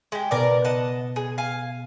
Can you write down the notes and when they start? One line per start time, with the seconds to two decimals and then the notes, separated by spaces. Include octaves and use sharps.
0.12 G#3 G4
0.31 B2 A#4 D5
0.65 D#5 F#5 A5
1.16 G#4
1.38 F5 G#5